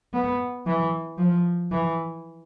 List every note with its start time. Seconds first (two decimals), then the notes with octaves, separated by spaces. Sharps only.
0.14 B3
0.66 E3
1.18 F3
1.71 E3